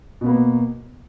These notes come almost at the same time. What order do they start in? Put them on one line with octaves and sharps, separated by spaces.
B2 B3 A#3